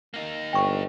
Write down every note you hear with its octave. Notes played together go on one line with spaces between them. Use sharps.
A#3 D#4
G1 G5 C#6